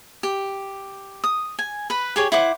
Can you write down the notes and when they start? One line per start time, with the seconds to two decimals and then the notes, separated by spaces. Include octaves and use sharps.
0.23 G4
1.24 D#6
1.59 G#5
1.90 B4 B5
2.16 G4 G#4 C#5
2.32 E4 C5 F#5 D6